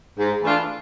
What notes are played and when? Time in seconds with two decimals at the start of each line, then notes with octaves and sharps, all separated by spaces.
0.18 G#2
0.43 E3 A3 D4 F4